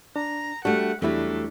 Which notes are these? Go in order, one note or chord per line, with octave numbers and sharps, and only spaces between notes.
D4 A#5
G3 A3 D4 F#4 F#5 A5
E2 F#3 G3 A3 D4 E4